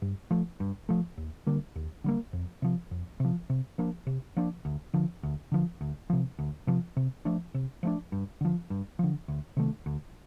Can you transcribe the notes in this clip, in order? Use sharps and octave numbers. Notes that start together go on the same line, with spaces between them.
G2
F3 A3
G2
F3 A3
D#2
D3 G3 A#3
D#2
D3 G3 A#3
F2
C3 F3
F2
C3 F3
C3
F3 A#3 D4
C3
F3 A#3 D4
D2
D3 F3
D2
D3 F3
D2
C3 F3
D2
C3 F3
C3
F3 A3 D4
C3
F3 A3 D4
G2
D3 F3
G2
D3 F3
D2
C3 D#3 A3
D2